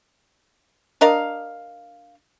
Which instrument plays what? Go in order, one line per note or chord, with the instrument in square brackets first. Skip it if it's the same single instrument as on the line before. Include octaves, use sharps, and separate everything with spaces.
[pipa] D4 A#4 D#5 F5